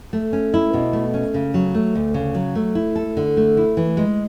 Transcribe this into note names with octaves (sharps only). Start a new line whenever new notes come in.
A3
C#4
E4
B2
A3
C#4
C#3
F#3
A3
D2
C#3
F#3
A3
E4
A4
D3
A3
E4
E3
G#3